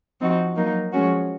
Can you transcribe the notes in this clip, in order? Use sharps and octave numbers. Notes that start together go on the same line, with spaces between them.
F3 C4 D#4 F#4
F#3 A#3 D#4
F3 G#3 C#4 F#4